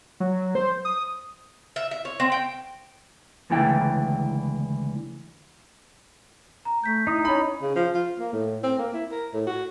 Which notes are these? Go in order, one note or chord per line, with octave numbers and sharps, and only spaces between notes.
F#3
C5
D#6
E5
E5
C#5
C4
G5
C#2 D3 E3 A3 G5
A#5
A3 G6 B6
D#4 E4 D#6
C#4 B5
C#3
F3
F4
A#3
A2
C4
A#3
E4
A#4
A2
F#4